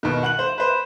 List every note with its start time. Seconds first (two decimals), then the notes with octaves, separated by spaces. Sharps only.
0.03 B2 D#3
0.23 F#5 F#6 F#7
0.39 C5
0.58 B4 C5